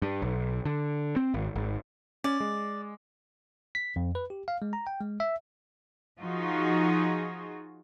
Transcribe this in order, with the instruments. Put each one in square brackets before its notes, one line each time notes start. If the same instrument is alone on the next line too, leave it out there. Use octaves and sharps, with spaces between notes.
[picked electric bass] G2
B1
D3
C4
G#1
G#1
[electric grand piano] C#4 [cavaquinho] D5
[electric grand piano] G#3
[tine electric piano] B6
F2
B4
G4
F5
G#3
A#5
G5
G#3
E5
[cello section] F3 D#4 F4 F#4 G#4